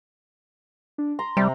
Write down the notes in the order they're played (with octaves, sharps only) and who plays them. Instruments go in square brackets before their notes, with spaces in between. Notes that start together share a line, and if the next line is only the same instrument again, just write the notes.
[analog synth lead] D4
[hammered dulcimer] A#5 [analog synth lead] C6
[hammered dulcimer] C3 [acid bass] G3